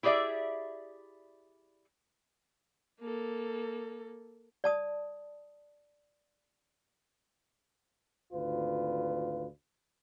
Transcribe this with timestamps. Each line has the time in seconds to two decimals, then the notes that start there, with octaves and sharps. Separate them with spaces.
0.03 E4 G4 G#4 D5 E5
3.01 A#3 A4
4.64 D5 A5 D#6
8.32 G#1 D2 F4 B4